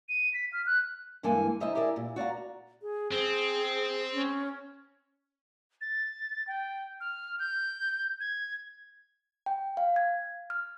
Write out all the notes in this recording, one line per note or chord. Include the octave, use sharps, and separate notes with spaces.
D#7
B6
F6
F#6
G2 E3 G#3 A#3 A4 G#5
D3 E4 C5 D#5 E5 A#5
G4 G#4 A#4 D5 E5
A#2
F#4 D5 F5 A#5
G#4
C4 G#4
C#4
A6
G5
F6
G6
G#6
G5
F5
G#6
F6